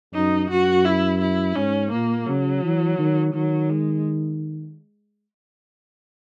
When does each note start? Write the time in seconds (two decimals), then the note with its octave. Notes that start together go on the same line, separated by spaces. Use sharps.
0.14 F#2 D#4
0.50 F#2 F#4
0.85 E4
1.22 E4
1.56 G#2 C#4
1.92 A#2 A#3
2.27 C#3 F#3
2.64 E3
2.99 D#3
3.34 D#3 F#3
3.70 G#3